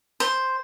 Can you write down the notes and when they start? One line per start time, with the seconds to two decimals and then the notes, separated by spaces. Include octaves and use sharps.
0.20 C5